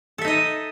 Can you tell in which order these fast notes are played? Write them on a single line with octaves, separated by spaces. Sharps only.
A4 E5 D#4 D#5